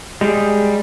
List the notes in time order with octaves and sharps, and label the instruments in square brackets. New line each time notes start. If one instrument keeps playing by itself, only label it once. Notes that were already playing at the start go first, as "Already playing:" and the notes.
[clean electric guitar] G3 [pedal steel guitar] G#3 G#4